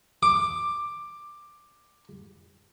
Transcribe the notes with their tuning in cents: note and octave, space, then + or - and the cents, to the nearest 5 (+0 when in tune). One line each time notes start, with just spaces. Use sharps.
D6 +10